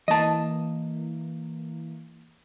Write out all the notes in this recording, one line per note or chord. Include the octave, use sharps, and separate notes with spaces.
E3 A#3 D#5 A5